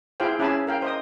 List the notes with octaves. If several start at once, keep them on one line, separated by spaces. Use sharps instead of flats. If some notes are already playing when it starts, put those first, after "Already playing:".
E4 F4 G#4 C5 F5 G5
C#4 E4 G#4 G#5 A5 B5
A#4 F5 G5
C5 D#5 D#6